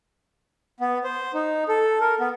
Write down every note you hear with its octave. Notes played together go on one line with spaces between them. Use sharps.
B3
C5
D#4
A4
A#4
B3